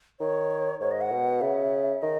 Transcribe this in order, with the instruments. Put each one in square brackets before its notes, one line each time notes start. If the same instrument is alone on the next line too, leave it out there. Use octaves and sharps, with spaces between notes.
[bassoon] D#3 [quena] C#5
[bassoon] G#2 [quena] C#5
[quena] D#5
F#5
[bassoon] B2
[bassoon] C#3 [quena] E5
[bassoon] D#3 [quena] D#5